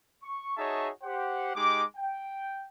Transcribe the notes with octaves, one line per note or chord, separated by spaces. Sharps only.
C#6
D#4 F#4 G#4 C#5 E5 A5
G4 C5 F#5
G#3 D#4 G4 D6
G5